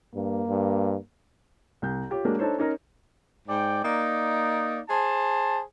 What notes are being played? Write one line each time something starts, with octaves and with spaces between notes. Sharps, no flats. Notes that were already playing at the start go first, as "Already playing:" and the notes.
G2 A#3
G2
C2 G6
F4 G4 C#5
F#3 G#3 A#3 D4 G4
D4 D#4 A4 C5 C#5
C#4 D#4 A#4 C#5
G#2 D5 G5
A#3 D#4 D5
G#4 C5 A5